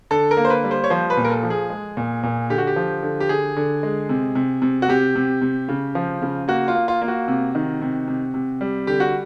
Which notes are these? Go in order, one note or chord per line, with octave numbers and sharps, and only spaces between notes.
D3 A4
A#4
A#3
C5
B4
G3
C5
C#5
F3 C5
B4
A#2
A#4
A4
F3
G#4
G#3
A#2
A#2
D3 G4
F#4
G4
F3
D3
G4
D3 G#4
D3
G#3
C3
C3
C3
F#4
C3 G4
C3
C3
C#3
F3
C#3
A#3 F#4
F4
A#3
F4
A#3 F4
F#4
C3
D#3
C3
C3
C3
G3
D3 G4
F#4